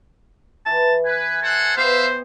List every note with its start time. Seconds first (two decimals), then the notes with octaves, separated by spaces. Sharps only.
0.66 E3 A5
1.05 B4 G#5
1.42 A4 C5 F#5
1.77 B3 G4 C5 E5 F5